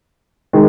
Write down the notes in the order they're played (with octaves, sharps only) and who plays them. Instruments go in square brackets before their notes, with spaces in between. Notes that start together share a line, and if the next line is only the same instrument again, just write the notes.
[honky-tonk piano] D#3 G#3